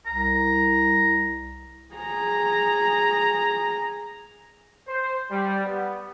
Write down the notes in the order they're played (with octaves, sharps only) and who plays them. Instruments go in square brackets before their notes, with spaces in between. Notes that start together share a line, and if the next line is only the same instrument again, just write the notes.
[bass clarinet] C2 [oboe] A#5
[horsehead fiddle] G#4 A#5
[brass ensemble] C5
G3
B3